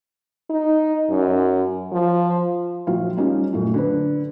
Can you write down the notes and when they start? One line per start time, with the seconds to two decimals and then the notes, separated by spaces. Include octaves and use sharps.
0.50 D#4
1.09 F#2
1.92 F3
2.87 A#1 F#3 F4 F5
3.17 G3 A#3 C#4 D#4 F4 G4
3.53 F#2 A#2 F#3 A3
3.74 D3 B4